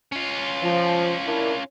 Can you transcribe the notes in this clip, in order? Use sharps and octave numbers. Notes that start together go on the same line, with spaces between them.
C#4 F4
F3
D4 E4 A#4